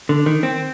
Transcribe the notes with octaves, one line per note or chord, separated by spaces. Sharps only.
D3
D#3
C4